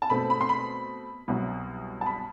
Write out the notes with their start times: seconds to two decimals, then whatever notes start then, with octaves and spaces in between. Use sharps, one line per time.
0.02 A5
0.10 B2 A3 C4 B5
0.30 B5
0.41 C6
0.49 B5
1.28 C2 B2 F#3
2.01 A5
2.06 B5